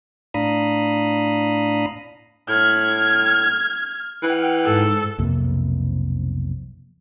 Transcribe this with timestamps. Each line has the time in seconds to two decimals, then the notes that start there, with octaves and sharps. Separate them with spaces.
0.34 A2 D4 F5 A#5 B5 D#6
2.49 A2 F6 G#6
4.23 E3 F#5 G5 F6
4.65 G#2 A4
5.19 B1 F2 C3 A#3